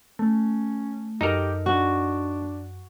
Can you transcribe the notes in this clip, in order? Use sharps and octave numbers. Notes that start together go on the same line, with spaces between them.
A3 C#4
F#2 D#4 G4 A4 A#4
D4 F#4